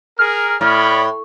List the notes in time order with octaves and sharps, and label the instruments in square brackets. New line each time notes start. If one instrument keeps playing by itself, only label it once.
[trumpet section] G#4 A#4 [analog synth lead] F6
[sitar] A2 [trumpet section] C#5 D5 B5